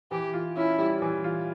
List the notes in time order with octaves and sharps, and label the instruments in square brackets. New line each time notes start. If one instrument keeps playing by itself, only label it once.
[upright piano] E3 [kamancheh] G4
[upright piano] F4
[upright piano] C#4 [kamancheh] E4
[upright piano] G3
E3
F4